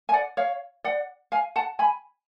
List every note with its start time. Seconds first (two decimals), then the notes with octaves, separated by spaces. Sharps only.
0.09 G#5
0.13 D5 F#5
0.37 C#5 F5
0.84 D5 F#5
1.32 F5 G#5
1.56 F#5 A5
1.79 G#5 B5